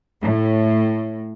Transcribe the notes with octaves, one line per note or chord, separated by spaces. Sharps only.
A2